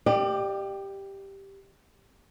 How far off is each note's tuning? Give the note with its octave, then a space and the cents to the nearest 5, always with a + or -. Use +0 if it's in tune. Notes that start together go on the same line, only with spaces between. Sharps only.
G4 +0 D5 +40 F5 -40